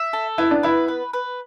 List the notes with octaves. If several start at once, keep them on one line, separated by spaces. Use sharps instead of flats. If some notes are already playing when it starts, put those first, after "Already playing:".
Already playing: E5
A4
B3 E4
D4
E4 B4
B4
B4